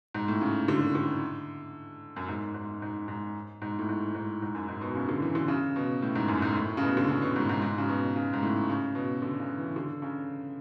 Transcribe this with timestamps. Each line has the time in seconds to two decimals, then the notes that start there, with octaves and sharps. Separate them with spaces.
0.15 G#2
0.28 A2
0.41 C#3
0.68 D3
0.95 D3
2.16 F#2
2.29 G#2
2.54 G#2
2.82 G#2
3.08 G#2
3.62 G#2
3.79 A2
3.89 G#2
4.15 G#2
4.42 G#2
4.55 F#2
4.68 G#2
4.81 B2
4.95 C#3
5.09 D3
5.22 E3
5.35 D3
5.48 C#3
5.76 B2
6.02 A2
6.15 G#2
6.28 F#2
6.42 G#2
6.55 A2
6.77 C#3
6.83 B2
6.97 D3
7.09 C#3
7.22 B2
7.36 G#2
7.49 G#2
7.62 G#2
7.78 C#3
7.89 B2
8.16 C#3
8.33 G#2
8.43 A2
8.69 C#3
8.95 B2
9.22 D3
9.40 C#3
9.58 E3
9.76 D3
10.02 C#3